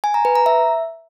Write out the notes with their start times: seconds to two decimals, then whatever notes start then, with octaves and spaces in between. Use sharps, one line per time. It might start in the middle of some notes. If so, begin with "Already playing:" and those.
0.04 G#5
0.14 A#5
0.25 B4
0.35 A#5
0.46 E5